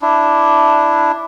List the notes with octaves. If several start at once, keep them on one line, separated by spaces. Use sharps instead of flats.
D4 E4